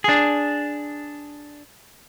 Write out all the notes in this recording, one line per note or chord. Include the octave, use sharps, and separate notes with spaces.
D4 G#4